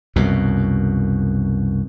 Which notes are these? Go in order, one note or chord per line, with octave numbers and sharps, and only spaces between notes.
C2 F#2 B2